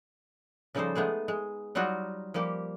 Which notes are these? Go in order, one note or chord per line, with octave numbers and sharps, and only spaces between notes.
C#3 F3 G3 D#4 A4 C5
G#3 A3 B3 G#4
G#3
F#3 G3 D#4 F4 F#4 A#5
F3 G3 A#3 G4